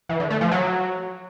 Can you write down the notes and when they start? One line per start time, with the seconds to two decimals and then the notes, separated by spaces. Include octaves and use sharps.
0.09 E3
0.20 D3
0.30 A3
0.41 F3
0.51 F#3